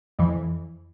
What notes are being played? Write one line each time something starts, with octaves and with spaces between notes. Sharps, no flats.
F2 E3